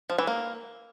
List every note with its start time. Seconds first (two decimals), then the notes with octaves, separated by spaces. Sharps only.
0.10 F3
0.18 E3
0.27 A#3